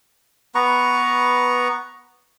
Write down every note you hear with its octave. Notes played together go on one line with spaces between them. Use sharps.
B3 B4 A#5 C#6